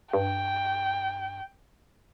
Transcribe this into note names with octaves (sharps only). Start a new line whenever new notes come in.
G2 G5